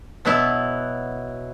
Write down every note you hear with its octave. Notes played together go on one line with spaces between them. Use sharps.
B2 F#3 B3 E4